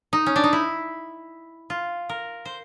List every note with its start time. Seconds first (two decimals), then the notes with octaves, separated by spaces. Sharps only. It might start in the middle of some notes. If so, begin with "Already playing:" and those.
0.13 D#4
0.26 C#4
0.36 D4
0.44 D#4
0.53 E4
1.70 F4
2.09 A#4
2.45 C5